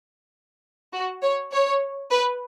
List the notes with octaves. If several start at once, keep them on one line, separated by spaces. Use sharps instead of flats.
F#4
C#5
C#5
B4